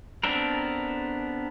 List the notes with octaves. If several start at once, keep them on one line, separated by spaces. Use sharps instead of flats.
B3 C4 D4 A4 A#4